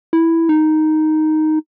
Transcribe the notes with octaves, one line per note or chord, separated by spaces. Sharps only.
E4
D#4